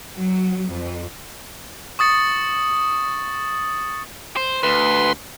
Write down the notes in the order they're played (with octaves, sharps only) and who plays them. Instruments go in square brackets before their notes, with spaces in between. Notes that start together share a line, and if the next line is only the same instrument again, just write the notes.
[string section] F#3
F2
[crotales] C#6 D#6 A6 C#7
[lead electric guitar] C5
[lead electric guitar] D2 [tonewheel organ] B4 C6